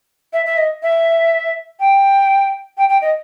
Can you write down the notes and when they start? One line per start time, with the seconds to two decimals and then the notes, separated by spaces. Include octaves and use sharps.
0.33 E5
0.46 E5
0.57 D#5
0.83 E5
1.80 G5
2.77 G5
2.89 G5
3.01 D#5